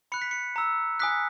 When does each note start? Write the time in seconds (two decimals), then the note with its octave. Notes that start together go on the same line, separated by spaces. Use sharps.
0.12 B5 F#6 C#7
0.22 B6
0.31 C#7
0.56 A#5 E6
1.00 G#5 D#6 F#6 B6